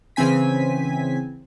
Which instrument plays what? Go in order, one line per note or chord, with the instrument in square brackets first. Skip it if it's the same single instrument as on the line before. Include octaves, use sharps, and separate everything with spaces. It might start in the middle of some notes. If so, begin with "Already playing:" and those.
[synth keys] C#3 E3 C4 G#5 B6